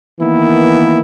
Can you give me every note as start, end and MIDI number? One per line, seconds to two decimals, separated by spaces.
0.20 1.00 51
0.20 1.00 52
0.20 1.00 58
0.20 1.00 59
0.20 1.00 64